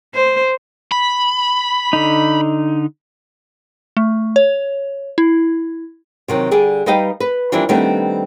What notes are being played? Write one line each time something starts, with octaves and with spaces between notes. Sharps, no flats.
C5
B5
D3 D#4
A3
C#5
E4
C3 D#3 F#3
D3 G3 G#4 D5
G3 D#4 B4 D#5 F5 G5
B4
E3 F3 G3 A#3 D4 E4
D#3 G3 A3 B3 C4 D4